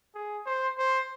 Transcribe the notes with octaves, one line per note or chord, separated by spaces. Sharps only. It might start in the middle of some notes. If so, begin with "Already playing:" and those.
G#4
C5
C5